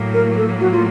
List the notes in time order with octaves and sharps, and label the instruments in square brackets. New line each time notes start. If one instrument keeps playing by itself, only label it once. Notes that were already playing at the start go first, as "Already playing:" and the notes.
Already playing: [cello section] A2 F#3 A#3
[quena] A#4
A4
F#4
F4